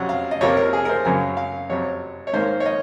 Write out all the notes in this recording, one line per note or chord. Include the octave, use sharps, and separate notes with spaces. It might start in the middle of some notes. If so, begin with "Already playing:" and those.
Already playing: F2 C3 F#3 C#4 F#5
F5
D#5
F2 C3 F3 A#3 C#5
A#4
G#4
A#4
C5
F#2 C#3 F#3 A#3 G#5
F5
F2 C3 F#3 C#5
C#5
G#2 D#3 A#3 C5
C#5
D#5